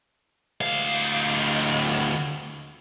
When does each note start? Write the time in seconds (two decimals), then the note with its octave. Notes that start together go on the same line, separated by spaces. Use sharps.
0.61 D2 F5